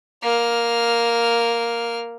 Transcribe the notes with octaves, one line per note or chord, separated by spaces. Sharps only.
A#3 F6